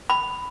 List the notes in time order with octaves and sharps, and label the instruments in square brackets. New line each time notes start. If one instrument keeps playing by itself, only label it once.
[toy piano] B5